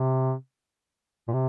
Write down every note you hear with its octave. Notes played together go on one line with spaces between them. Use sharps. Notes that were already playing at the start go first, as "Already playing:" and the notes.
Already playing: C3
A#2
C3